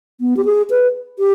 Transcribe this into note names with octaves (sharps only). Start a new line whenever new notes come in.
B3
G4
G#4
B4
G4